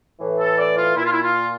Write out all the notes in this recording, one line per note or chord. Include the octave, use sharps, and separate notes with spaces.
A2 E3
A4
D5
F4
A#2 E4
F4
E4
F4